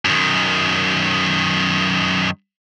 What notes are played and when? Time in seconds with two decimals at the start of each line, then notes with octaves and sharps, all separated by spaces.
0.05 F#2 D#3